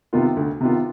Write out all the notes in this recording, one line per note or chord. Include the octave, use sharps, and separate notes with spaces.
C3 D#3 B3 F4
D2
C3 D#3 B3 F4